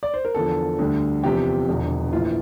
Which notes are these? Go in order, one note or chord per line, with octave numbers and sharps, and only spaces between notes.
D5
C5
A#4
E2 D3 F3 A4
D2 D3 G3
E2 C3 F3 G4
E1 E2 D3 F3
A#1 A2 E3 F4